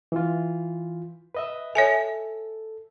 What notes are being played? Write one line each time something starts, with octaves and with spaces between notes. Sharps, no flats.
E3 F4
B4 D#5 E5
A4 C#5 E5 G#5